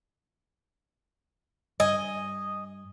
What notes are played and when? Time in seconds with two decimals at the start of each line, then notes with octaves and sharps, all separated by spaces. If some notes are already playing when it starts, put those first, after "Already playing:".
1.80 G2 D#5 G#5